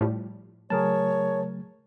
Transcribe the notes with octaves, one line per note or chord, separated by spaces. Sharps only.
A2 F3 G3
C#3 F#3 A3 G#4 A#4 C#5 A5